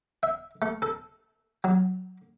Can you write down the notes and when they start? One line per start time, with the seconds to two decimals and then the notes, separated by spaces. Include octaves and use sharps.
0.23 E5
0.62 A3
0.82 A4
1.64 F#3